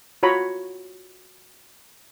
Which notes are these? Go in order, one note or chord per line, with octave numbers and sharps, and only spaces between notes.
F4 F#4 C#5 A#5 B5